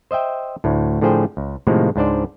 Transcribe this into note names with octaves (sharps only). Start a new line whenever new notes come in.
C5 D#5 E5 G5
D2 A2
A2 D3 F3 G#4 C5 G5
C#2
A2 C3 D#3 F3 G#3 A#3
C#2 G#2 D4 C5 D5